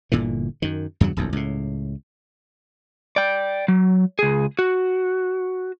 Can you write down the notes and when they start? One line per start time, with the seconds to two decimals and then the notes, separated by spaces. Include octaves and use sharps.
0.12 G1 A#2 D3 E3
0.62 F#2 D#3
1.01 E2 G2 C#3 F#3
1.17 D#1 B1 F2
1.33 C#2 A2
3.16 D5 G5
3.68 F#3
4.19 C#2 G#4
4.59 F#4